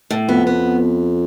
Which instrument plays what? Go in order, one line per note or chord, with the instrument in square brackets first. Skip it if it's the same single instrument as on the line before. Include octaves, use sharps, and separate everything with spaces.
[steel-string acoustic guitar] A2
[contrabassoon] F2 [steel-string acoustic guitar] B3
[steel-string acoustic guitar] B3